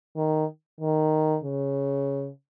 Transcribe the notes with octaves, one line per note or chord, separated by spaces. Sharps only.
D#3
D#3
C#3